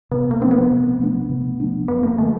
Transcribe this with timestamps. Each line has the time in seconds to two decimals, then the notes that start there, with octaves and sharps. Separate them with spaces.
0.11 C3 B3
0.31 A#3
0.41 F3 A3 C4 D4
0.51 B3
0.71 C3
1.00 F3 A3 D4
1.30 C3
1.60 F3 A3 D4
1.88 F#2 B3
2.03 A#3
2.18 D3 F3 A3